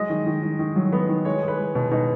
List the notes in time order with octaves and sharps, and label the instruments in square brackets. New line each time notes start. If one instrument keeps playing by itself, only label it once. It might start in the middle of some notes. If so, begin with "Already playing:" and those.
Already playing: [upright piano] F#3 G#3 D#5
D#3
D#3
D#3
D#3
F#3
B3
D#3
G#3 C#5
G#3
B4
G#3
B2
B2 D#4